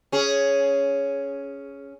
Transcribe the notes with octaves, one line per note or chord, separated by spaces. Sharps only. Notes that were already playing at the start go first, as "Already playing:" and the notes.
C#4 G#4